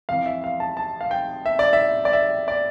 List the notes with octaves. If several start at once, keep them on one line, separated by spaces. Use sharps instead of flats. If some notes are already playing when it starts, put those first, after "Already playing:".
F2 E3 F5
E5
F5
A5
A5
F5
G5
E5
D5
E5
D5
E5
D5